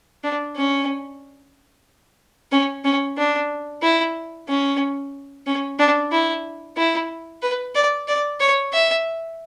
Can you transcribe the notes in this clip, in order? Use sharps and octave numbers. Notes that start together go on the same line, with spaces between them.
D4
C#4
C#4
C#4
D4
E4
C#4
C#4
D4
E4
E4
B4
D5
D5
C#5
E5